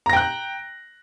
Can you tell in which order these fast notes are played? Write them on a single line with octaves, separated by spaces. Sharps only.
A#5 A#6 G5 F#6